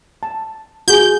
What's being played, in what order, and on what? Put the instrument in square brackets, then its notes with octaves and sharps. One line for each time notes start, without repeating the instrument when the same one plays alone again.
[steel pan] A5
[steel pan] F#4 G#4 [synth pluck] G6